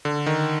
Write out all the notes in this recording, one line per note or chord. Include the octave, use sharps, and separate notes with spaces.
D3
D#3